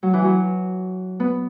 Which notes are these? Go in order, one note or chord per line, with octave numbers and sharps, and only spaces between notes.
F#3
E3
F#3
B3